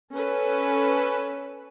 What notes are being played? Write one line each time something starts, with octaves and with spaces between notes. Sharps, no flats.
C#4 A4 B4